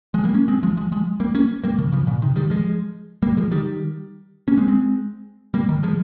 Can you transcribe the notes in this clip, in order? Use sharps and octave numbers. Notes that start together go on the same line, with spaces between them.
F3 G#3
G3 A#3
A#3 C#4
G#3 C4
F3 G#3
F3 G#3
F3 G#3
G3 A#3
A#3 C#4
G3 A#3
C#3 F3
C#3 F3
A#2 C#3
C3 D#3
D#3 G3
F3 G#3
G3 A#3
F3 G#3
D#3 G3
A#3 C#4
G#3 C4
G#3 C4
G3 A#3
D#3 G3
F3 G#3